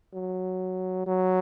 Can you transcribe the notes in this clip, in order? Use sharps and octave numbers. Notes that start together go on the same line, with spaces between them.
F#3
F#3